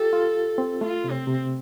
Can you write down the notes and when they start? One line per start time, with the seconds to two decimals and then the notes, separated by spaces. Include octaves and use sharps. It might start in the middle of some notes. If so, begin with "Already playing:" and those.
Already playing: F4 G4 A4
0.13 F4
0.58 C4
0.81 A3 F4
1.04 C3
1.12 C4
1.27 C3